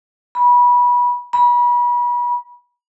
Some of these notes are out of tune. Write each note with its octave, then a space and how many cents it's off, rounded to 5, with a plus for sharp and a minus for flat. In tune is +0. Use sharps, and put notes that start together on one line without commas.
B5 -25
B5 -35